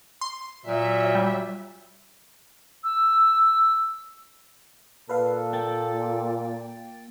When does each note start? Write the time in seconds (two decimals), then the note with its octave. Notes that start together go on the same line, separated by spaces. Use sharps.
0.21 C6
0.66 A#2 F#3 E5
1.15 G3
2.84 E6
5.09 A#2 A4 B4 F5
5.53 A#3 G5 A6